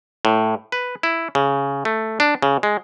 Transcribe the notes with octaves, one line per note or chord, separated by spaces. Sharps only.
A2
B4
E4
C#3
A3
D4
C#3
G#3